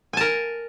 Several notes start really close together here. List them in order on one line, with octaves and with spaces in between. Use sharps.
G#5 A5 A#4